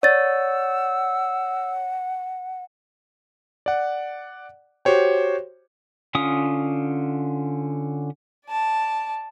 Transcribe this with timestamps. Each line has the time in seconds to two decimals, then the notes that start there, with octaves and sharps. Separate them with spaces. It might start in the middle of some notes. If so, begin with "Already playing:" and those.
0.03 C#5 D5 F#5 E6 A6
3.66 D5 F#5
4.85 F#4 G4 C5 C#5 G5
6.15 D3 C#4 F4 D#6
8.46 D5 A5